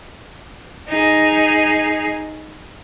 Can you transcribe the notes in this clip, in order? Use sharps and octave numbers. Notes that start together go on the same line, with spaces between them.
D#4 G#4